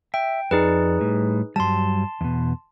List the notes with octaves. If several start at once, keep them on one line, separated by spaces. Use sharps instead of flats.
E5 G5
F2 D#4 G#4 B4 D5
A2 G3
G2 F#3 G3 A5 C6
E2 B2